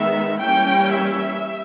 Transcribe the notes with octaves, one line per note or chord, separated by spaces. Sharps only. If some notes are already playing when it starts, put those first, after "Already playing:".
Already playing: D#3 G#3 B3 E5
E3 G3 A#3 C#4 G5
E5